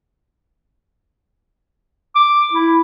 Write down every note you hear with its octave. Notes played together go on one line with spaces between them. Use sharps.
D6
E4